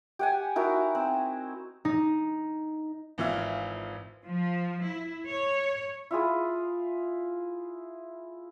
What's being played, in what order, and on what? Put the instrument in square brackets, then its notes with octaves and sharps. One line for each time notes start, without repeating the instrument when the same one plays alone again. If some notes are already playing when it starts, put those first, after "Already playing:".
[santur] G4 F#5 G#5
D#4 E4 F#4 A#4
C4
[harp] D#4
[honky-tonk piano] G#1 E3 F4 E5
[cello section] F3
E4
C#5
[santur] E4 F4 G#4